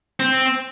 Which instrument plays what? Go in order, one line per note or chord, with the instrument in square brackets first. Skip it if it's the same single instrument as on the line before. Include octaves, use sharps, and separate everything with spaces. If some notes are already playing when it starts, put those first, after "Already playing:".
[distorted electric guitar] C4